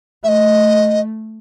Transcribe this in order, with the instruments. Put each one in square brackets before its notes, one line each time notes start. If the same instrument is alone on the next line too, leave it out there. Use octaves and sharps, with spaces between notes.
[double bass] A3 [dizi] D#5 E5